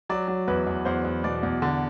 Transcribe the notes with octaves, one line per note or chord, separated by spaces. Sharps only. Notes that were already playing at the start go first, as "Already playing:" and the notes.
F#3 D5
F#3
E2 B4
E2
E2 C5
E2
B2 D5
E2
D3